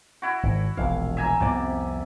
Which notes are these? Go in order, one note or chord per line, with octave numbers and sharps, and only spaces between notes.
E4 F#4
G#1
E1 A#1 A#2 F5
E5 G#5 A#5
C2 F2 C3 B3 D5